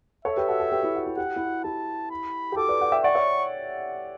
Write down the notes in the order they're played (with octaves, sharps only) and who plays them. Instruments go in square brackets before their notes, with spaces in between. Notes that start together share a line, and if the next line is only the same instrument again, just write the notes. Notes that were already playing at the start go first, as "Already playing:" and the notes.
[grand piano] A4 C#5 [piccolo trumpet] E5
[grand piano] G4 B4
F#4 A4
F#4 A4
G4 B4
E4 G4
F#4
E4
[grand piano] G4 [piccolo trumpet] F#5
[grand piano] F#4
E4
F#4
[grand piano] E4 G4 [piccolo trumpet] A5
[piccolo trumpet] B5
[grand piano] G4
[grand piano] F#4 A4 [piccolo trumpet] D6
[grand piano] B4 D5
D5 F#5
E5 G5
[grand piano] D5 F#5 [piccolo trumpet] C#6
[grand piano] C#5 E5